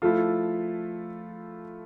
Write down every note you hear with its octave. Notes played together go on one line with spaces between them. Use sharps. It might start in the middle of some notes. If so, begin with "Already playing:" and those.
F3 A3 E4 F4 A4